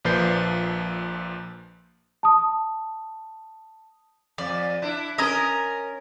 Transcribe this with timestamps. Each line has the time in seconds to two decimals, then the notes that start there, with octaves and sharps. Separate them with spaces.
0.05 A#1 A#2 F3 B4 G6 C7
2.23 A5 D#6
4.38 F2 D5
4.82 D4 E4
5.18 C#4 A#4 D#5 A#5 D#6